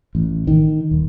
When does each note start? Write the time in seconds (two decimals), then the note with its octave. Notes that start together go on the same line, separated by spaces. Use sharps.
0.15 A1
0.47 D#3
0.91 D#1